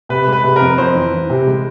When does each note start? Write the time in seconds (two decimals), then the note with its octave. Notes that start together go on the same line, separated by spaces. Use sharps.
0.09 C3 B4
0.27 G#3
0.33 B4
0.44 C3
0.56 F2 A#4
0.78 F2 C5
0.95 E3
1.13 E3
1.30 C3
1.47 G#3